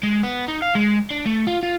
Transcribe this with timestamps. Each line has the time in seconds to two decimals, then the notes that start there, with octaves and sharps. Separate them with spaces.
0.03 G#3
0.23 B3
0.48 D#4
0.62 F5
0.75 G#3
1.11 D4
1.26 A3
1.47 F4
1.63 F4